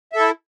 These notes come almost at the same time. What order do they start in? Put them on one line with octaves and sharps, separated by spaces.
E5 A4 E4